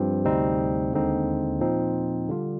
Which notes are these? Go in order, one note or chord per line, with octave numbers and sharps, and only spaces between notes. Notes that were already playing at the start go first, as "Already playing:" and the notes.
Already playing: G2 F3 C4 G4
D2 C3 G3 C4 D#4
D#2 D3 G#3 C4 D#4
A#2 F3 C4 D#4
D3 G3 D4 F4